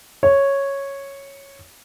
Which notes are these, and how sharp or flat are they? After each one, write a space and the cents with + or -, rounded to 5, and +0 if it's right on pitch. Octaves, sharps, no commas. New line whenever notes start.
C#5 -5